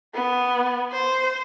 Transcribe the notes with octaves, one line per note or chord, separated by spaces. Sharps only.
B3
C5